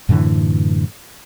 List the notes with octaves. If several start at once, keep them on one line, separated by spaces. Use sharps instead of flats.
F#2 A2 D3 E3